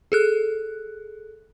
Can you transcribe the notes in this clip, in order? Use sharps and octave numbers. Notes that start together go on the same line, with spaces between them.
G#4 A4 F#6